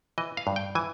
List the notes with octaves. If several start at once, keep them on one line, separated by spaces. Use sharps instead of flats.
E3 D#5
F5
G2
G5
E3 G#5